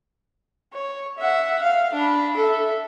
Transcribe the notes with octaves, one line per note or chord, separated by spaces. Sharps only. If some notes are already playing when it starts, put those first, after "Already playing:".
C#5
E5 F#5
F5
D4 B5
A4 E5